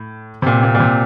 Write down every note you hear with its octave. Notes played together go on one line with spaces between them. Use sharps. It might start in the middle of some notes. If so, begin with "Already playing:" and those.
Already playing: A2
C3
A#2
A#2
A#2
C3